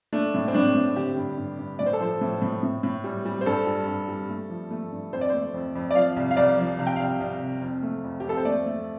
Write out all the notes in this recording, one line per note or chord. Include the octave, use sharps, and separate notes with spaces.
A3 D4
A2
C4
A2 D4
A2
D3 G4
G2
G2
G2
A2 D5
C5
A4
F3 C5
A2
A2
A2
A2
G3
G3
C5
G2 A4
G3
G2
G3
A3
F3
A3
G2
F2 C5
D5
A3 C5
F2
F2
D5
F3 F5
C2
F5
C2 D5
F3
C3 F5
G5
C2 F5
C2
C2
F2
A3
F2
G4
F2
A4
C5
A3 D5
A3